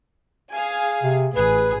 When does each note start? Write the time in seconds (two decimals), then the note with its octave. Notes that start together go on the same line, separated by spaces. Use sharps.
0.51 G#4 F5 G#5
1.03 C3
1.36 A1 G#4 B4